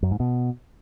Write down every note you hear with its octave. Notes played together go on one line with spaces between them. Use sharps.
F#2
G#2
B2